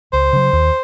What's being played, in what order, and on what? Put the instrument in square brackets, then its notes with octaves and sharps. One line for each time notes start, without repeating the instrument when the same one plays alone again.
[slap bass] C#2 [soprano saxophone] C5
[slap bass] C#3 F#3
D#2